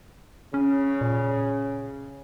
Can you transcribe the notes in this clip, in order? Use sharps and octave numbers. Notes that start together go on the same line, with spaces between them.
C#3 C#4
A#2